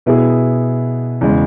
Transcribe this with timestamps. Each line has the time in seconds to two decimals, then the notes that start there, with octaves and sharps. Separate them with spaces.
0.06 B2 B3 E4 G#4
1.21 E2 C#3 G#3